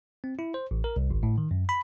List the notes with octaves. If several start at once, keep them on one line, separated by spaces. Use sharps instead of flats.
C4
E4
C5
A1
A#4
C2
G#1
A2
D#3
F#2
B5